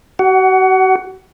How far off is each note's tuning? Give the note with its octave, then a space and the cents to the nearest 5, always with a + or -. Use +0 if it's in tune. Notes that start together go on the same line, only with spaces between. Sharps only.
F#4 +40 F#5 +15